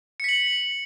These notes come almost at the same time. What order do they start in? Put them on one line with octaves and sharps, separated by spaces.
C#7 B6 F#7